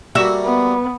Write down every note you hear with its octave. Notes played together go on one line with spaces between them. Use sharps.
G3 A3 A#3 F#4 E5
B3